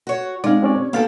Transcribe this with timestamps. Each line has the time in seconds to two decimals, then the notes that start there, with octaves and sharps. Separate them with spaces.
0.07 F#4 C#5
0.44 G#3 C4 D#4 D5 F5
0.62 C4 C#4 F4 G4 D5
0.75 C#5
0.93 A#3 B3 F#4 G4 A4 F5 A6